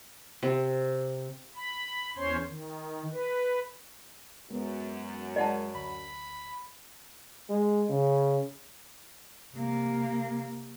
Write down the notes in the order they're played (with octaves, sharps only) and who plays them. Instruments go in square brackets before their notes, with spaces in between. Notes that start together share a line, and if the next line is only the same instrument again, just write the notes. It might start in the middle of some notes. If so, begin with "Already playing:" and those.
[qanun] C3
[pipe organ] B5
E2 C#4 C5 C#5 C6
D#3
B4
[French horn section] F#2 [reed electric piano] G#3 B3
[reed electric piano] G#3 A#4 [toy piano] D5 F#5 A5
[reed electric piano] D2 [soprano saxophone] B5
[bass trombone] G#3
C#3
[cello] C3 A#3